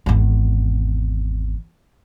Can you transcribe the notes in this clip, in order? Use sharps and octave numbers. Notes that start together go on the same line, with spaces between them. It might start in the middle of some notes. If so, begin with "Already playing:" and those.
G#1 E2